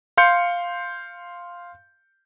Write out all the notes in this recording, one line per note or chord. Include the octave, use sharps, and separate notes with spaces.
F5 C6 G6 C#7